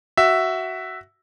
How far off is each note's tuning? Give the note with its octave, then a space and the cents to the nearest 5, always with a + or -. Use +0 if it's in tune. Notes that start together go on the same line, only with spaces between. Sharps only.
F#4 +10 E5 +0